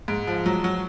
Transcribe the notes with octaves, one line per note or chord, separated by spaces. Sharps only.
G#2
F3
F#3
F#3